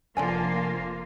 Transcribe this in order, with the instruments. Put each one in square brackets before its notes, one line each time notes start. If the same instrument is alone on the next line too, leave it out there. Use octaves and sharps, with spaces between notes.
[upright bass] F1 [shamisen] D3 D4 G#5 [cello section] F3 A#3 F4